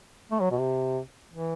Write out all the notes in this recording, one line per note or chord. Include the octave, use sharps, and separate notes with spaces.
A3
F#3
B2
C3
E3